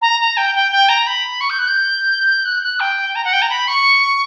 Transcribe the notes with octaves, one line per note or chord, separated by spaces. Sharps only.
A#5
A#5
G5
G5
G5
A#5
B5
C#6
G6
F#6
G6
F#6
F#6
G5
A#5
F#5
G5
A#5
B5
C#6